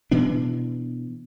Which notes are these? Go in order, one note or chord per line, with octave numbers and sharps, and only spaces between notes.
B2 E3 B3 D4